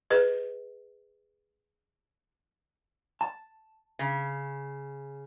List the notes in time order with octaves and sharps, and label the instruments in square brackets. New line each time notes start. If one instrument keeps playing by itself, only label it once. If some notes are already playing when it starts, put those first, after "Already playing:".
[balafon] G#4 B4 D#5
[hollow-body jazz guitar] A5
[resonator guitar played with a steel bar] C#3